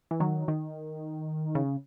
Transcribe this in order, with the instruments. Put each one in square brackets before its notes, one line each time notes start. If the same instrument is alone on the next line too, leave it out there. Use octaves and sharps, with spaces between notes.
[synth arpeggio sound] E3
D#3 F#3
D#3
C#3